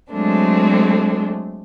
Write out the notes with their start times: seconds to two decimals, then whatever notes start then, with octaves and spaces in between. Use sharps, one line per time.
0.11 F#3 G#3 A3 C4 D4